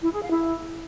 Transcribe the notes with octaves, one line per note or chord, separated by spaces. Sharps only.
E4
G#4
F5
E4